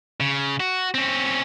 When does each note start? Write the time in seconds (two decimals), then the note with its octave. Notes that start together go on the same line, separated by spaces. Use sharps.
0.20 C#3
0.60 F#4
0.95 C4 C#4